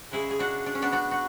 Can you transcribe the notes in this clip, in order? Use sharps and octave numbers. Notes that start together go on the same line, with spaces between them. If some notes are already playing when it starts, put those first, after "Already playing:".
C#3 G#3 E4 G#4
G#4
D4 F#4
D4
C#4
B3 D4
D4 F#4
F#4